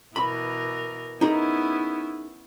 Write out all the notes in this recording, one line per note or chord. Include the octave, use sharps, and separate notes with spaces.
B2 E3 A#4 B5
B3 C#4 D#4 E4 G#4 A#4